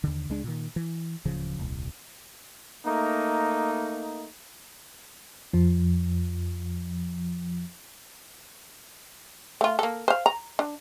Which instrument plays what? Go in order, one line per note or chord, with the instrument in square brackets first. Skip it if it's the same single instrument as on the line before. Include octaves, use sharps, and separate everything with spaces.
[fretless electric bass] D#2 D3
C#2 G#3 D4
A#2 D#3
E3
D1 C#3 F3
D#1 C2
[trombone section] A3 A#3 D#4
[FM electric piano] F2 F3
[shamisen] A3 F4
A#3 A4
C5 F5
A#5
D4